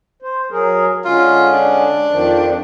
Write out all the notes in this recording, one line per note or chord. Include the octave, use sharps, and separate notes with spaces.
C5
F#3 G#4 A#4
D3 G#3 C#4 F4
D4
F2 D#3 F3